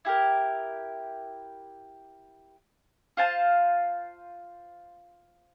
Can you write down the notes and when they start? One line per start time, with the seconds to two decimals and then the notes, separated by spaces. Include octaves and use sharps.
0.05 E4 G4 A#4
3.17 F4 C5 F5 A5